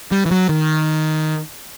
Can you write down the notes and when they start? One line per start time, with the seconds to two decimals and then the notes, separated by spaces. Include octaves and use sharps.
0.12 G3
0.26 E3
0.31 F#3
0.49 D#3